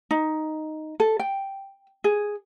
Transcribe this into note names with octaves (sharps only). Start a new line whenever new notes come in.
D#4
A4
G5
G#4